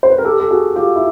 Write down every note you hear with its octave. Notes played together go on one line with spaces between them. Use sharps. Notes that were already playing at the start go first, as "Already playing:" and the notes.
C5
B4
A#4
G4 A4
A4
F#4 G#4
F4 G4
E4